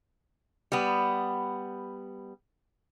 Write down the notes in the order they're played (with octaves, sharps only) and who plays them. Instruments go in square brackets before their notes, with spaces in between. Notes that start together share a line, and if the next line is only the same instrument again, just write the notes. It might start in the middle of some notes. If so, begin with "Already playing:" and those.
[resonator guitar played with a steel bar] G3 B3